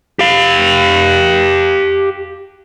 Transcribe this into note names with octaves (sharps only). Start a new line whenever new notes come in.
G4 F5